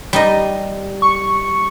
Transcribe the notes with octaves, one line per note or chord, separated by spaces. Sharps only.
G3 D#4 D#5
C#6